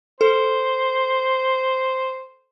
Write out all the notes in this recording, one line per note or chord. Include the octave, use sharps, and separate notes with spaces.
A4 C5